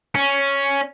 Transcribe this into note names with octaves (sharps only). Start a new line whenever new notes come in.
C#4